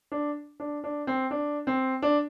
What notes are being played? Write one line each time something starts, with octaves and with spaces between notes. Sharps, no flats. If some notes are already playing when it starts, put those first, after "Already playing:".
D4
D4
D4
C4
D4
C4
D4